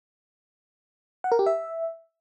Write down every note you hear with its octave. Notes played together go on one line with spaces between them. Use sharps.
F#5
A#4
G4
E5